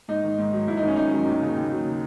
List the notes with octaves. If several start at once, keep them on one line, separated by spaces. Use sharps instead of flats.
G#2 D#4
D#3
G#2
F#3
G#2 E4
D#4
D#3
C#4
G#2 D#4
F#3
D#2
C#3
D#2
F#3